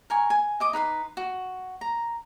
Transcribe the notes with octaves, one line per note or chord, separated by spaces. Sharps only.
A#4 G#5 C#6
G#5
D#5 D6 D#6
D#4 B4 F#5 C6
F#4
A#5